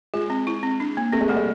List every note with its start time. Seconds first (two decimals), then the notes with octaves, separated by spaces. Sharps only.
0.14 G#3 F4
0.30 C4
0.47 E4
0.63 C4
0.80 D4
0.97 A#3
1.13 A3 C4
1.21 G#3
1.29 G3 A3
1.37 G#3